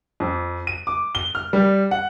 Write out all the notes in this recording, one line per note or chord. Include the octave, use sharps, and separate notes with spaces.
F2
D#7
D6
G7
F6
G3
F#5